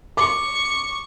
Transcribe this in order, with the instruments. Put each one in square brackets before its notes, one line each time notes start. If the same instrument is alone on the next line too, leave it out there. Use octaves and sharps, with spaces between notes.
[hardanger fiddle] C#6 [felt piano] D6